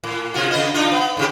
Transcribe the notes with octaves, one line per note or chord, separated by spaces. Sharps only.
A2
C3 F4 F#4
C#3 B3 D#5
D4 D#4 F4
B3
G#2 C#3 G4